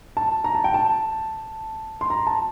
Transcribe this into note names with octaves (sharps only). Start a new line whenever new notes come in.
A5
A#5
A5
G5
A5
C6
A#5
A5